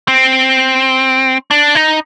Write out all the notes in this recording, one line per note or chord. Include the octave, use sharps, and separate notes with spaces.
C4
D4
D#4